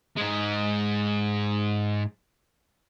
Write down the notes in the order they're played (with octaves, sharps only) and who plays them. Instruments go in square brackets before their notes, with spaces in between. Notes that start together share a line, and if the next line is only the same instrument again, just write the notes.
[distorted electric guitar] G#2 G#3